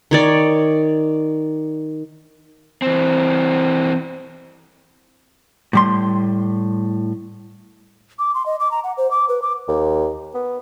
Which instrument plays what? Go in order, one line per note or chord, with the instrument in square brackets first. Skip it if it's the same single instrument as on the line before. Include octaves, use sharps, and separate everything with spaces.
[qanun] D#3 C#5 D5
[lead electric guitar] E3 C4
[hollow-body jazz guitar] A2 G3 C6
[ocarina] D6
C6
D#5
D6
A#5
F#5
C5
D6
B4
D6
[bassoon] D#2
B3